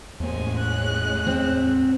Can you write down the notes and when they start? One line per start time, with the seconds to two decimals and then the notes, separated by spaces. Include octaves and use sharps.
0.20 E2 A2 G#3 A#3 C#4 C5 G#5
0.59 F#6
1.27 C4